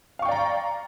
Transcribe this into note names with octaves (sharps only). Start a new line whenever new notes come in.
D5 F5 G5 A#5 C#6